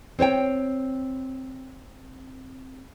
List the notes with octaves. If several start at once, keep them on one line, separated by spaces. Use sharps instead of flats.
C4 C5 C#5 G5